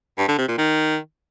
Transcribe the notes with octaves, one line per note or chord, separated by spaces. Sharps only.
G2
D3
C3
A#2
D#3